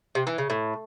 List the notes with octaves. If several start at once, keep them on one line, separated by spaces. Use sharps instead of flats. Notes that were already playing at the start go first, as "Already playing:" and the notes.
C3
E3
C#3
A2